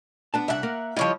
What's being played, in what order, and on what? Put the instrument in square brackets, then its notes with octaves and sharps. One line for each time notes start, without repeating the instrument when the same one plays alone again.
[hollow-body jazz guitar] B3 D4 A5
[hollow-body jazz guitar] C2 D4 [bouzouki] E5 F#5
[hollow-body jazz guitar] A#3 A#4
[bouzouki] F3 C#5 D#5 [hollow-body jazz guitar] G3 E4 F4